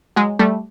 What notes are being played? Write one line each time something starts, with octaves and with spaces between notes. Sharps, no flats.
F#3 G#3
G3 A3